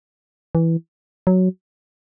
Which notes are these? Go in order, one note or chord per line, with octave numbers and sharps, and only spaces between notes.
E3
F#3